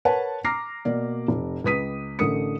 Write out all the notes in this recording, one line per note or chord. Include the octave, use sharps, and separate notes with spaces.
A#4 B4 C#5 F#5 A5
A#5 D6 F6 A#6 C7
B2 A#3 D5
F1
C#2 B4 D#6 B6 D#7
A1 D3 A3 A#4 D#6 C#7